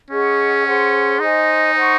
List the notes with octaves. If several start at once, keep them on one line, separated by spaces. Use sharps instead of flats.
C#4 G#4 D#5 F#5 C#6
G#4 C5 F#5 C6
D#4 C5 D#5 G#5
C5 F#5 C#6